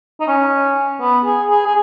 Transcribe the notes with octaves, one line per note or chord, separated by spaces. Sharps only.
D#4
C#4
B3
G#4
G#4
G#4